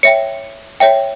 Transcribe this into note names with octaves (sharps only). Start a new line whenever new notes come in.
C#5 E5 G5 C#7
C#5 E5 G5